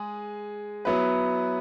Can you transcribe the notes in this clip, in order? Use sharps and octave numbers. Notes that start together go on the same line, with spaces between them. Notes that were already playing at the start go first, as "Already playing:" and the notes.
Already playing: G#3 G#4
F#3 B3 E4 B4